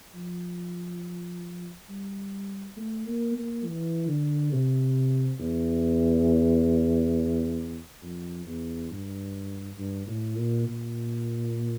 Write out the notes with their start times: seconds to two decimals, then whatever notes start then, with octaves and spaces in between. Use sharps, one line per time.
0.14 F3
1.89 G3
2.77 A3
3.06 A#3
3.35 A#3
3.65 E3
4.08 D3
4.52 C3
5.40 E2
8.02 F2
8.46 E2
8.91 G2
9.78 G2
10.07 A2
10.36 A#2
10.65 A#2